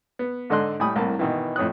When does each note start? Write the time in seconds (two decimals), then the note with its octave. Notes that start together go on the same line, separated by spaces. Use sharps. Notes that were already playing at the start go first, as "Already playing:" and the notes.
0.19 B3
0.50 G#2 D3 A4 D#5 C6 F#6
0.80 A2 G3 G#5 B5 D#6
0.96 C2 A2 A#3 A5
1.19 B2 D#3 E3
1.56 F2 A2 C#5 D#6 F#6